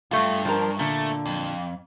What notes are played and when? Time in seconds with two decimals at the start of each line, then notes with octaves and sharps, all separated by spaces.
0.11 D2 G2 A3 F4
0.45 F3 D4 A#4
0.79 A#2 D3 A3
1.26 F2